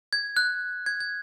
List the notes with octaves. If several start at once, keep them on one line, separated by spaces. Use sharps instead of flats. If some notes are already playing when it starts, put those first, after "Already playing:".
G#6
F#6
G#6
G#6